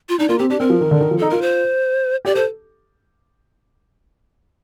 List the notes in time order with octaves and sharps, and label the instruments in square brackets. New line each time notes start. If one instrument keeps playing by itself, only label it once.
[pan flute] F4
[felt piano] D4 [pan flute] D#4
[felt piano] A#3 [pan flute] F4
[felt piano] C4 [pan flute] G4
[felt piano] D4 [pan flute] G4
[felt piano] C4 [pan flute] A#4
[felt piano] F3
D#3
D3
D#3
F3
[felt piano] D#4 [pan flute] A4
[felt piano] F4 [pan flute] A#4
[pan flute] C5
[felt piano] G4 [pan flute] D5
[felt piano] A4 [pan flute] C5